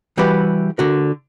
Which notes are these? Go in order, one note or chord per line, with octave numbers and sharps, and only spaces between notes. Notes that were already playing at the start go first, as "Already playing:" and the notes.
E3 G3 E4 F#4 G4 B4
D3 F#4 A#4